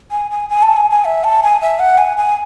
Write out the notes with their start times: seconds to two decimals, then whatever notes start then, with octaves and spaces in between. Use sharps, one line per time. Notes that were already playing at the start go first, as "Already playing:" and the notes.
0.11 G#5
0.31 G#5
0.49 G#5
0.63 A5
0.77 G#5
0.90 G#5
1.05 E5
1.24 A5
1.43 G#5
1.61 E5
1.79 F#5
1.98 G#5
2.17 G#5